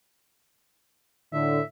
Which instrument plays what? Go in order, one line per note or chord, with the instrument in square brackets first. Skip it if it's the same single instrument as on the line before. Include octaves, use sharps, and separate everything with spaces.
[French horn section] A2 D3 [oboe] E5